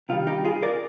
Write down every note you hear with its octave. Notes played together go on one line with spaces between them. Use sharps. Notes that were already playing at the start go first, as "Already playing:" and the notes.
C3 D#3 G3 F4
D#4 G4
F4 G#4
A#4 D5